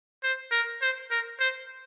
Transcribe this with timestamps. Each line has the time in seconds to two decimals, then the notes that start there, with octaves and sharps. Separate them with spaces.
0.24 C5
0.52 A#4
0.82 C5
1.11 A#4
1.40 C5